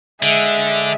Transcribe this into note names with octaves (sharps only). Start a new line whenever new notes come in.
D3 G#3 E5